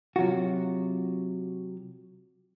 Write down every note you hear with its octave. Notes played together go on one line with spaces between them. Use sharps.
C3 F#3 F4 F#4